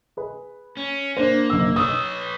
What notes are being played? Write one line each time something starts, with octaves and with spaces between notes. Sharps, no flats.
G#4 B4
C#4
A#3 D4 C5
F#1 E6
B4 C#5 D#6 E6